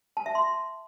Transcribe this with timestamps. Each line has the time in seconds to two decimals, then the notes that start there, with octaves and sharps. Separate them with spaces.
0.17 A5
0.26 E5
0.35 C6